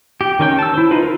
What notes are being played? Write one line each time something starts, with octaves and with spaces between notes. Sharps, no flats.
G4
D#3 C#4 G5
A5 E6
E4 C5
D#4 F4 B4
F4 A#4